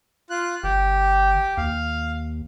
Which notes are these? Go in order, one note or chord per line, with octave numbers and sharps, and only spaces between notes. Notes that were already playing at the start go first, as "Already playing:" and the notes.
F4 F#6
G1 G4
D#2 F5